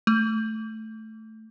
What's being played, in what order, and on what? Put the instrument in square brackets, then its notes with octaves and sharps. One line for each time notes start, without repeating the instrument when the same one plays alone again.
[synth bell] A3